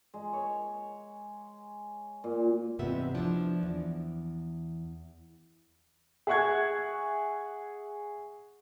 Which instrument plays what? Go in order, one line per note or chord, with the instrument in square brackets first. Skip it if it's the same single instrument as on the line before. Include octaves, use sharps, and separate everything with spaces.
[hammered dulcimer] G#3
C#5
A#2
[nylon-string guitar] E2 G#2 C3 B3 E5
F3 D4 E4
E2
[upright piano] G#4 E5 F#5 C#6 F#6 G#6